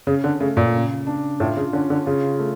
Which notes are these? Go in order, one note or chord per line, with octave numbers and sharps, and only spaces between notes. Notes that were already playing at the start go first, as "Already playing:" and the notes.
C#3 C#4
D3
C#3 A3
A#2
C#3
D4
A2 F4
C#3
D3 C#4
D3
C#3 F4
A3